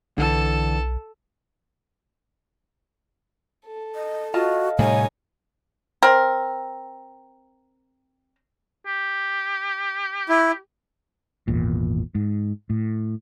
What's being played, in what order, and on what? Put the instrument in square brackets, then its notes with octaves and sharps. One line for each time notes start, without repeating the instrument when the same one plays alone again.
[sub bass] B1 [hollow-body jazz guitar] D3 E3 [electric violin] A4 A5
[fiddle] A4
[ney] D#5
[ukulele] F4 D#5 A5 [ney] F#4
[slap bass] A2 C3 G3 [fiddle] D#4 C#5 [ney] G#5
[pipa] C4 A#4
[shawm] G4
[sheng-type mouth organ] E4
[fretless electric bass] G#1 E2 A#2
G#2
A2